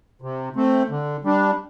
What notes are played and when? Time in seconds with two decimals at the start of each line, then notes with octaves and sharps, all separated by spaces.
0.22 C3
0.56 A3 C4
0.90 D3
1.24 G3 D4